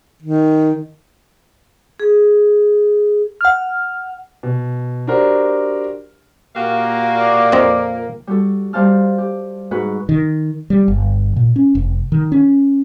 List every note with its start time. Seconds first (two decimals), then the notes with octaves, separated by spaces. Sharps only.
0.22 D#3
2.00 G#4
3.41 F#5 F6
4.43 B2
5.07 D4 F#4 G4 A#4 C5 D5
6.56 A#2 A#3 F#4 G4 F5
7.16 D5
7.52 F2 C4 D#5
8.27 G3 F#4 A4
8.73 G3 C5 F5 A5 F6
9.18 G4
9.71 G#2 F#4 B4 F#6
10.09 D#3
10.70 G3
10.88 G1
11.36 A#2
11.56 C#4
11.75 F1
12.12 D#3
12.32 C#4